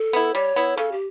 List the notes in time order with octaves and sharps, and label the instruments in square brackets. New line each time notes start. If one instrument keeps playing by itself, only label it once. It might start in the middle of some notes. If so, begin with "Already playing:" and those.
Already playing: [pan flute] A4
[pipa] B3 E4
[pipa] G3 [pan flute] C#5
[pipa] B3 E4
[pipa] C#3 [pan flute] A4
[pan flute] G4